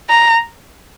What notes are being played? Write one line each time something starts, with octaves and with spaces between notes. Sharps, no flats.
A#5